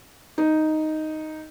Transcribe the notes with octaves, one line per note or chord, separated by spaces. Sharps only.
D#4